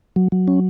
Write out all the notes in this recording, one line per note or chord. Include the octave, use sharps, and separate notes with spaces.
F#3
F#3
C#4